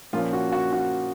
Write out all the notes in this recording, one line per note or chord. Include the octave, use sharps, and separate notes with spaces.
A#2 F3 A#3 C#4 F4
F#4
F#4
F#4